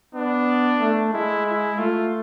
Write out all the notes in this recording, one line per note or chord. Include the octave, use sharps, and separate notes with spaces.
B3 D4
A3
G#3 E4
E4
A3 F4